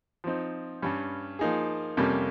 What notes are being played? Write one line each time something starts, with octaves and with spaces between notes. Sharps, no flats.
F3 C4 D#4
G2 G3 C#4
F3 A#3 D#4 G#4
F2 C3 G3 A#3 C#4